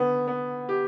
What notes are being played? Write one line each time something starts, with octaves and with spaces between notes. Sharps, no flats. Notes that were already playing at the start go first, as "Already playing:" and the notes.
Already playing: D3 B3
B3
G4